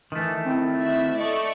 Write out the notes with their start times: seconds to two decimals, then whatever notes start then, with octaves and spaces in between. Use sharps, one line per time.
0.12 D#3 E3 A3
0.45 C4 E4
0.81 F#4 E5
1.18 A3 D5 D#5 C#6